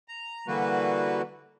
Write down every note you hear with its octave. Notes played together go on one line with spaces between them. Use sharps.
A#5
D3 E3 G3 A#3 F#4 B4